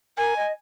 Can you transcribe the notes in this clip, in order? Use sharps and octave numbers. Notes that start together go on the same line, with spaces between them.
A#4 G#5
D#5